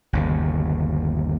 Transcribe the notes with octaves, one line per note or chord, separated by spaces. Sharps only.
G1 D#2 C#3